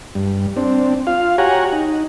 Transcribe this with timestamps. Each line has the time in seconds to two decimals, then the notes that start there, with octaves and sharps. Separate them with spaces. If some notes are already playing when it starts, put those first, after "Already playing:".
0.15 G2
0.57 C4 D4
1.07 F4 F5
1.38 F#4 G4 C#5 F#5 G#5 A#5
1.73 D#4